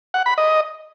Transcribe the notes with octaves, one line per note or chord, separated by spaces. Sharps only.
F#5
B5
D#5